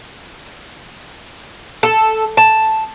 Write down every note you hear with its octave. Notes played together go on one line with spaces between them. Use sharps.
A4
A5